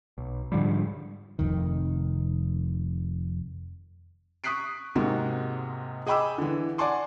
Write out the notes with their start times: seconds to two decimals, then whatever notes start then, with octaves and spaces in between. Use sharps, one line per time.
0.18 B1
0.52 G#2 D3 F3 G3
1.39 F1 F2 D#3
4.44 C#6 D#6 F#6 B6 C7 D7
4.95 G#2 C3 G#3 A#3 F#4
6.07 G#4 D#5 G5 B5 D6 E6
6.38 D3 E3
6.78 D5 F#5 G#5 A5 C6 D6